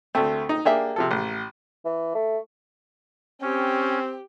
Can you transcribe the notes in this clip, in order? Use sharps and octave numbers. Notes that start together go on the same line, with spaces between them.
D2 A3 C4
D#4
A#3 D4 G4 G#4 E5
C3 F3 A4
A1
E3
A3
C4 C#4 G4